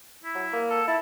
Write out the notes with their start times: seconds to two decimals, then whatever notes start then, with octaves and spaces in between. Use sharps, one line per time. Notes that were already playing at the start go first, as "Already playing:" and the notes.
0.24 E4
0.35 F#3
0.53 A#3
0.70 A4
0.88 E4 A5